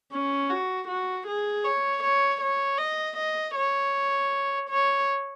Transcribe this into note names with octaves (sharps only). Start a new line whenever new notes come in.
C#4
F#4
F#4
G#4
C#5
C#5
C#5
D#5
D#5
C#5
C#5